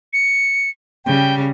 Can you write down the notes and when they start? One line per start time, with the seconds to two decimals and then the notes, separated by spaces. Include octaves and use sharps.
0.13 C#7
1.05 C#3 G3 G5